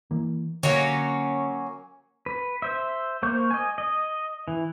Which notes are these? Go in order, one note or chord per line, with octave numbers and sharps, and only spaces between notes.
E3 A#3
D3 F#3 A#3 C#4
B4
C5 E5
A#3 C5 C#6 G6
D#5 G#5
D#5
E3